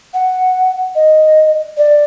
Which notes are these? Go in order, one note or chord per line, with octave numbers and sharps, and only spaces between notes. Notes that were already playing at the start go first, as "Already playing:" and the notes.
F#5
D#5
D5